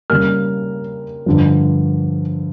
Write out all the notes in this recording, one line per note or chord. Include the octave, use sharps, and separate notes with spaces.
C#3 G3 A#3 F6
G2 D3 F3